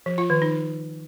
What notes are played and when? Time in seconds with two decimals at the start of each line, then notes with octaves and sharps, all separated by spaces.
0.06 F3
0.18 F4
0.30 D#3
0.42 D#4